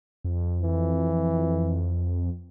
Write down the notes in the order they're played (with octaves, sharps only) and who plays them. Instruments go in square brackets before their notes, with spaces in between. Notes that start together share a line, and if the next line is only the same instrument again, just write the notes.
[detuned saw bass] F2
[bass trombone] E3